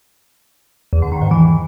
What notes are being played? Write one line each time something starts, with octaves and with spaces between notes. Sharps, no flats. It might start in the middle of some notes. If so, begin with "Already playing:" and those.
E2
D3
D#3
G#2
E3